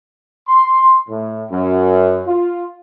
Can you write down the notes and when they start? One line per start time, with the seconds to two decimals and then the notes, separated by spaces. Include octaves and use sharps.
0.47 C6
1.08 A2
1.50 F#2
2.27 F4